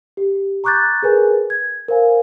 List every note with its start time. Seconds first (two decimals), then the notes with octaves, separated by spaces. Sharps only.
0.17 G4
0.64 A#5 C#6 D6 F#6 G6 A6
1.03 G#4 A#4 B4 G#5
1.50 G#6
1.88 A#4 C5 F5 G#5